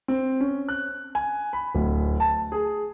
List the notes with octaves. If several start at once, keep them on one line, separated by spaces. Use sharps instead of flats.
C4
C#4
F#6
G#5
B5
D1
A5
G#4